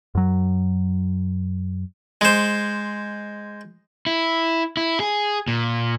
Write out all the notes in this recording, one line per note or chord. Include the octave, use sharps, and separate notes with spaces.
F#2 F#3
G#3 C5
E4
E4
G#4
A#2